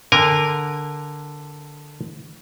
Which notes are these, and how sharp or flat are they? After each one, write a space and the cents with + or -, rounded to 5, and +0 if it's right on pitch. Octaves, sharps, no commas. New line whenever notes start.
D3 +0 A#4 +0 G#5 -30